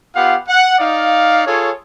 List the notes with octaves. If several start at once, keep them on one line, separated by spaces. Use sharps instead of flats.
B3 F4 G4 F5 F#5
F#5
D#4 D5 F5
F4 G#4 A4 C#5